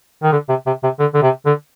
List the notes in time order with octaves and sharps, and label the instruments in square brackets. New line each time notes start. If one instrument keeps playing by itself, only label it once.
[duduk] D#3
D3
C3
C3
C3
D3
D3
C3
D3